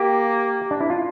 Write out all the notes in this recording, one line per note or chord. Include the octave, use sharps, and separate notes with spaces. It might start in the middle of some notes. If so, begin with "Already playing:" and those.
Already playing: A#3 G4
D4
E4
F4